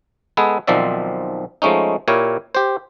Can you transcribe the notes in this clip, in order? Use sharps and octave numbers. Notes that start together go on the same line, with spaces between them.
G#3 B3 G#4 A4 B4
B1 D#3 F3 C4 D5 E5
F3 G#3 A3 C#4 D#4
A#2 E4 G4 A#4 C#5
G4 C5